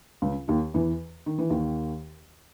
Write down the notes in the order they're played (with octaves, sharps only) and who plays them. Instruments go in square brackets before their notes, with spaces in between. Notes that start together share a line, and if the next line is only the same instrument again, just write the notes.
[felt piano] C#2 C#3
D#2 D#3
E2 E3
D#3
E3
D#2 D#3